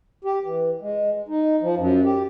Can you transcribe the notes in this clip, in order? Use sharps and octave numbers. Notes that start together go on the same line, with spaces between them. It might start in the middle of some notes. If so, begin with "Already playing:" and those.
G4
E3
G#3
D#4
F3
F#2
G4